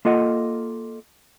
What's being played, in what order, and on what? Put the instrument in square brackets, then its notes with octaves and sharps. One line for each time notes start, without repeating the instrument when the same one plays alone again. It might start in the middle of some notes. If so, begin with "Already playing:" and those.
[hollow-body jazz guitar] A#3 F4 A4 D#5 F#5